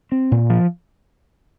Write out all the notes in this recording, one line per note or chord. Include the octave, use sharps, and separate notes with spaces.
C4
A#2
F3